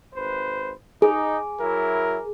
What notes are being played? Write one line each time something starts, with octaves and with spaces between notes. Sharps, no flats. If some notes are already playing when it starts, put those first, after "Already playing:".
G#1 B4 C5
D#4 G#4
F#3 E4 A#4